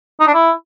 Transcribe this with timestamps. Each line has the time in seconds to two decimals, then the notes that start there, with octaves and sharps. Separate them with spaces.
0.20 D#4
0.27 D4
0.34 E4